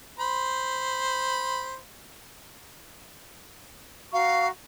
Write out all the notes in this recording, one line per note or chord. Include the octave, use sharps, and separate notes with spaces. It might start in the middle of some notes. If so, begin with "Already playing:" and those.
C5 B5
F#4 F5 A#5 C#6